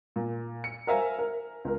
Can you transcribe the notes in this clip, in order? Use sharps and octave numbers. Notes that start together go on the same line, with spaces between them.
A#2
C#7
A#4 C5 E5 F5 G#5 A#5
A#4
C#2 A#4